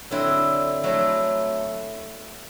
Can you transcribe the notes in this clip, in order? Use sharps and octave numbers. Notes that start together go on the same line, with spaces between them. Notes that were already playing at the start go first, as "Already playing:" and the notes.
D3 F#3 C4 E4
F#3 A3 E4